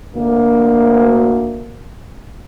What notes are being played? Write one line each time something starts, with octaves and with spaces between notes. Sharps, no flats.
D2 A#3